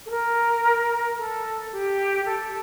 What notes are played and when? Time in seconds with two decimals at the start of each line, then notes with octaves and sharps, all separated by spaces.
0.06 A4
0.10 A#4
1.18 A4
1.72 G4
2.26 A4